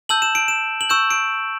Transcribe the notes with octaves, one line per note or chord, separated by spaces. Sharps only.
A5 E6 G6 F#7
E7
D7
E7
F#7
C#6 E6 G6 E7
D7